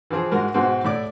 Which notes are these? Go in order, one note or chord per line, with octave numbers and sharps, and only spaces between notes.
E3 F3 C4 G#4
G#2 G#3 F#4 A#4
G#2 B2 G#3 B3 C4 F#4
A2 E4 D5 D6